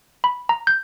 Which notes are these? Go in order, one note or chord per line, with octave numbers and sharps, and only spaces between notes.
B5
A#5
G6